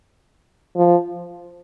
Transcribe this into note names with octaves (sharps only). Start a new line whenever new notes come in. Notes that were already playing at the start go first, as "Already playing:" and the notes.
F3